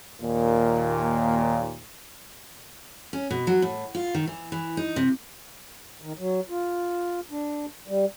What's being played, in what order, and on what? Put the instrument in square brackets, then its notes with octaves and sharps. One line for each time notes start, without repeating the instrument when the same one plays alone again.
[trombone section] D#2 A#2
[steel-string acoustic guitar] C#4
B2
F#3
A2
F4
D#3
E3
E3
D#4
C3
[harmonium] D#3
F#3
F4
D4
G3